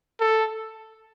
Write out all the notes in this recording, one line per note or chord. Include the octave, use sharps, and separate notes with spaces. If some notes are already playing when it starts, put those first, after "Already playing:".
A4